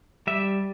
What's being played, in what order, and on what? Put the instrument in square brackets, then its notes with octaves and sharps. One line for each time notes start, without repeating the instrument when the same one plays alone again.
[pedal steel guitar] G3 E5